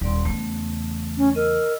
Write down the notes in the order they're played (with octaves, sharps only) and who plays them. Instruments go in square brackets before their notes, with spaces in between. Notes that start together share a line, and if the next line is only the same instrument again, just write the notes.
[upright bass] D#1 [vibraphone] G3 D5 C6
[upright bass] E2 C#3 [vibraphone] A3
[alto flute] C#4
[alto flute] A#4 [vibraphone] D#5 E6